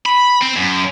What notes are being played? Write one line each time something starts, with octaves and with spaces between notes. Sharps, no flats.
B5
C4
F#2